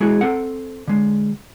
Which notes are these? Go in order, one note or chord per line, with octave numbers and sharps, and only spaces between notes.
G#3 E4 F#4 G#4
C4 A4 F#5
D3 G#3